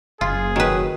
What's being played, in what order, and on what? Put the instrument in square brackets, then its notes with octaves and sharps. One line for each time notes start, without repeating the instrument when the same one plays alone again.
[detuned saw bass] F#1 [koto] F4 [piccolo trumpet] G#4
[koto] D#3 B4 [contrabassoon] F#3